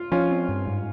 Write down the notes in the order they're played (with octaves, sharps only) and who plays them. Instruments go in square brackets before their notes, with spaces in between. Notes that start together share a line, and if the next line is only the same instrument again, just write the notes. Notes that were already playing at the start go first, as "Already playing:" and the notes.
Already playing: [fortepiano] F4
[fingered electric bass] F3 [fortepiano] C#4 F4
[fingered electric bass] C4
G2
G#2